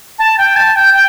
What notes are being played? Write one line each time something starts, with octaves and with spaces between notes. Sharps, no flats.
A5
G5
A5
G5
G5